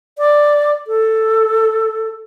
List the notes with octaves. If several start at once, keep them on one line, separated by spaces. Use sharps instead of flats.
D5
A4